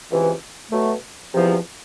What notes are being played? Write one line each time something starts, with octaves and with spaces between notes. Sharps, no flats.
C#2 C3 E3
B2 F#3 A3
E2 C3 F3